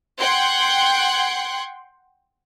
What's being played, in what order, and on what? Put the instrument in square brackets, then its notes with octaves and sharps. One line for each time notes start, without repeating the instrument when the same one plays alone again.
[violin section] F#5 G5 C6 F#6 G#6